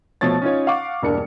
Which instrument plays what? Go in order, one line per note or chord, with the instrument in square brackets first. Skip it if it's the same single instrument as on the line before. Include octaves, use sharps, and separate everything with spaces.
[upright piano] B2 F3 A3 C#5 A6
C#4 D#4 F4 C#5
F5 F#5 C#6 D6
E1 G2 A#3 D4 A#4 C#7